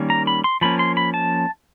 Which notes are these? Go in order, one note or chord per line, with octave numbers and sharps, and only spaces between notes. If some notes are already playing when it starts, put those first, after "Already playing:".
Already playing: D#3 G3 A#3 C#4
A#5
B5
C6
F3 A#3 C#4 B5
C6
B5
A5